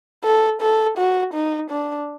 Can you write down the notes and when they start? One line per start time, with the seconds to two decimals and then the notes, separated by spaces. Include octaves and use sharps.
0.24 A4
0.61 A4
0.98 F#4
1.34 D#4
1.70 D4